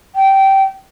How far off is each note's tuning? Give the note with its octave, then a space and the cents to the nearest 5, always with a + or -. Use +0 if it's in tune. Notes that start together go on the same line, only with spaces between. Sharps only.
G5 -15